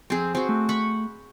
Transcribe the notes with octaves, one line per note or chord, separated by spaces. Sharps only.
F2 C4 G#4
C4 F#4 C5
A3
F#5 B5 C#6